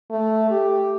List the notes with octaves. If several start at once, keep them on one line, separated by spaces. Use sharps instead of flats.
A3
G4